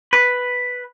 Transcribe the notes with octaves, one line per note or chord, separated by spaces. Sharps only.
B4